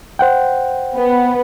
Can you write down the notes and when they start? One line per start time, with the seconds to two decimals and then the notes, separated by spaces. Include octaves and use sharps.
0.19 C5 F#5 G5
0.95 B3